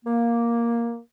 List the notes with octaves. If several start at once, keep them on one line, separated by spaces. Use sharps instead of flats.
A#3